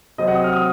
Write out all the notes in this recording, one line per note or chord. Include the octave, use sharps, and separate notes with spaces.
C3 F#3 C4 D#5
F#5
D#6
F6
D#6